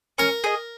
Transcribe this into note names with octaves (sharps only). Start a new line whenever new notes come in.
C#4 A#4
G#4 D#5